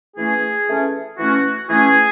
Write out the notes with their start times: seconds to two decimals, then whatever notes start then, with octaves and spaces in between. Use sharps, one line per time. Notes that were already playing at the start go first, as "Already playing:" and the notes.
0.17 E3 A3 C#4 G#4
0.68 E3 A3 C#4
1.19 E3 A3 C#4 F#4
1.70 E3 A3 C#4 G#4